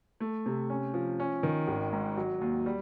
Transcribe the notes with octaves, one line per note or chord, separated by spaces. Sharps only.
A3
C3
C#4
F3
C#4
D#3
G#1
G#2
F#3
D#2
G3